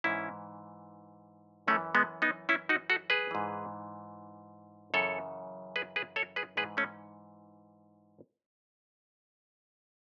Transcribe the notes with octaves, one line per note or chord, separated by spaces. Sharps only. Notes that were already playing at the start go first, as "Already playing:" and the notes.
G#2 E3 C#4 E4
F#2 E3 A3 C#4
G#3 B3
B3 D#4
C#4 E4
D#4 F#4
F#4 A4
G#4 B4
G#2 E3
F#2 C#3 E3 A4 C#5
G#4 B4
G#4 B4
A4 C#5
G#4 B4
G#2 E3 G#4 B4
A3 C#4